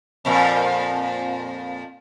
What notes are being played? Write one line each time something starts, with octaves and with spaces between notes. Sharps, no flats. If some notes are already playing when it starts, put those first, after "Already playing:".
F2 A#2 F3